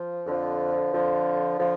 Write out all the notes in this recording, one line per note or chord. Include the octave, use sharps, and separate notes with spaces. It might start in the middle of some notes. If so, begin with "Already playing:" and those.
Already playing: F3
F2 D3 F3
F2 D3 F3
D3 F3